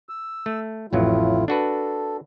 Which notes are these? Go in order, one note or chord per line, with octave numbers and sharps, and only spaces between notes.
E6
A3
A1 F2 A2 F#3 E4 F4
D4 F#4 A4 B4